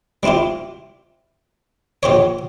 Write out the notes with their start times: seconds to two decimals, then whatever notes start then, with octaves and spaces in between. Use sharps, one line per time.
0.23 G3 C4 E4 F4 G4
2.03 A#1 G4 C5 C#5